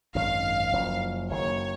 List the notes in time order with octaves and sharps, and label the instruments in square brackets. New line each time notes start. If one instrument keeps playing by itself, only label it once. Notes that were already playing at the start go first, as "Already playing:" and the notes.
[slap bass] G#1 F#2 D#3 [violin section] F5
[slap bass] F#1 F#2 F3
[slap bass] F#1 F#2 D#3 F#3 [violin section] C#5